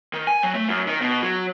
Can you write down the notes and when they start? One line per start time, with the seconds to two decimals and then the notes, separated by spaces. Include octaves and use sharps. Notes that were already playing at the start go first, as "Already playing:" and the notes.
0.13 D#3
0.27 G#5
0.43 F#3
0.55 A3
0.69 F#2
0.87 D#3
1.01 B2
1.22 F#3